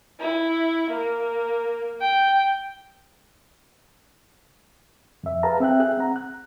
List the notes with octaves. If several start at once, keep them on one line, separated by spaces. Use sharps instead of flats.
E4
A#3
G5
F2 E5
G#4 B4 F5 A5 A#5
C4 E5 G5 F#6
G#4 E5 F#6
C4 F#5 A#5
F#6